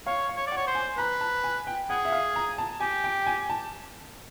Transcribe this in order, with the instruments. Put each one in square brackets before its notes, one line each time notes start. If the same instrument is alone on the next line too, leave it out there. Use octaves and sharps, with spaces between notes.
[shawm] C#5 [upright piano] F5
[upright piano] F5
[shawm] C#5
D5
[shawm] C#5 [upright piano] F#5
[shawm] C5
[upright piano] G#5
[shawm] B4 [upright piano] A#5
[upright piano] A5
G#5
G5
[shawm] G#4 [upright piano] F#5
[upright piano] E5
F5
A#5
A5
[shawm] G4 [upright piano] G#5
[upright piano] G5
G#5
A5